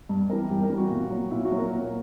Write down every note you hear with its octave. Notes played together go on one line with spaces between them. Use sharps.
G2
E3 G3 A#4
G2 G4
A#4
E3 G3
F#4
A#2
F#3
A#2 E4
F#4
F#3
A#4
A#2